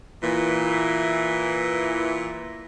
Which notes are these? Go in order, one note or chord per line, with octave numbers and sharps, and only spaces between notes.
A#2 E3